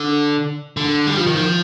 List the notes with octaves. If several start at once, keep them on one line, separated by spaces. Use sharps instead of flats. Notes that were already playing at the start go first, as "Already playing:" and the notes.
Already playing: D3
D3
G3
F3
D#3
F3